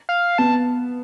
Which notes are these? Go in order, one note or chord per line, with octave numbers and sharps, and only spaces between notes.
F5
B3 A5